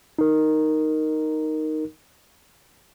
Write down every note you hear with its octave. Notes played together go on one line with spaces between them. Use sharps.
D#4 A#4